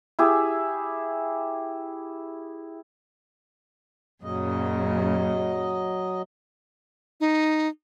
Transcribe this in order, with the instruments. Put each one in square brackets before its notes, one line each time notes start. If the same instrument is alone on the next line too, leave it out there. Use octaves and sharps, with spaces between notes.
[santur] E4 G4 G#4
[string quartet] F#2 A#2 C#3 [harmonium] F#3 D#5
[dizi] D#4